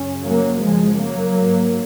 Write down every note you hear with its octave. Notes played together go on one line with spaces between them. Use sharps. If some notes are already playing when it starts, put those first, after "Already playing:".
Already playing: F#2 C#3 C#4
F#3 A#3
F#2 C#3 F3 G#3
F#3 A#3
G#2